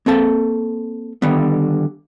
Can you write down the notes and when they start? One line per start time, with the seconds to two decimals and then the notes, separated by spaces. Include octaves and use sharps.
0.06 A#3 C4 A4 A5
1.22 D3 D#3 G3 B3